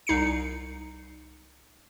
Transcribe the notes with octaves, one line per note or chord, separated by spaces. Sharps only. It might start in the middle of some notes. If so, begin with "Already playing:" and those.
C2 D#4 C7 C#7